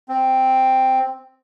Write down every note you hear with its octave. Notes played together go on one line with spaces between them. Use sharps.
C4